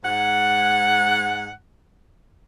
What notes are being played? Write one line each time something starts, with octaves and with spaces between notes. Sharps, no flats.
G#2 F#5